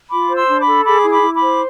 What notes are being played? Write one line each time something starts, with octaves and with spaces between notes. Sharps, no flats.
F4 B5 D6
C5
C6 E6
D4
B5 D6
A4
G#4 B5 D6
E4
B5 D6
E4
B5 D6
C5